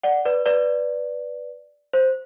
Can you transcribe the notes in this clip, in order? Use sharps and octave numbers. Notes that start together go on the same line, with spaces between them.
D5 F#5
B4 D5
B4 D5
C5